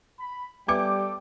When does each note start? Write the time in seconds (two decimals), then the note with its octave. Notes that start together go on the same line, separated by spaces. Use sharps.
0.19 B5
0.68 G3 B3 G4 A4 B4 E5 G5 D6